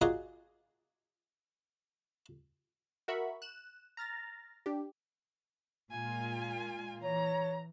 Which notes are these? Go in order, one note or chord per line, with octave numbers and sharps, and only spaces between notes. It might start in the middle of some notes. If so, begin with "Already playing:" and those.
F4 F#4 G#4 A#4 D5 D#5
F#4 A#4 E5 B5 C#6
F#6 E7
A#5 F6 A6 A#6
D4 G4
A#2 G#3 F4 G#5
E3 C#5 A#5